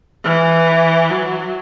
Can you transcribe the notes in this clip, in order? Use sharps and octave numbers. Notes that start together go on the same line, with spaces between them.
E3
F#3